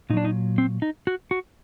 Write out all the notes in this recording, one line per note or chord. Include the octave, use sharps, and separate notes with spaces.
A#2 F#3 D4 D#4
D#4
C4
D#4
F#4
F#4